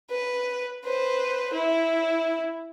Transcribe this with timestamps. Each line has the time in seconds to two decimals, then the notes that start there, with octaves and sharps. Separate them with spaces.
0.10 B4
0.85 B4 C5
1.53 E4